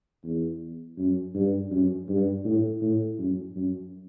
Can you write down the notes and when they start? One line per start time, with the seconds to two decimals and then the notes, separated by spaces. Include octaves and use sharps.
0.24 E2
0.98 F#2
1.35 G2
1.71 F#2
2.09 G2
2.45 A2
2.82 A2
3.19 F#2
3.56 F#2